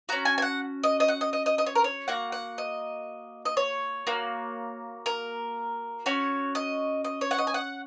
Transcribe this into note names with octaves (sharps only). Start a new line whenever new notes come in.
C#4 F#4 A#5
G#5
G#5
F#5
D#5
D#5
F#5
D#5
D#5
D#5
D#5
C#5
A#4
C#5
A#3 F#4 F#5
F#5
D#5
D#5
C#5
A#3 F#4
A#4
C#4 F#4 C#5
D#5
D#5
C#5
F#5
D#5
G#5
F#5